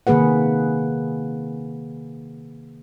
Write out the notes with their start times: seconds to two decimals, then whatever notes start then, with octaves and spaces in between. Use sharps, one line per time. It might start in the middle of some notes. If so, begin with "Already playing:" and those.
0.07 C3 D#3 A#3 G#4 B4 F#5